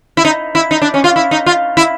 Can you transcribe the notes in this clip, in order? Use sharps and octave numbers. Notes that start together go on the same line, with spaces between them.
E4
D#4
E4
D#4
D4
C#4
F4
E4
D#4
F4
E4